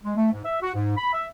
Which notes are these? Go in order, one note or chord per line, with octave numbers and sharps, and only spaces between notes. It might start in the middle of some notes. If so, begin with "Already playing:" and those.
G#3
A3
G#2
E5
F#4
G#2
B5
E5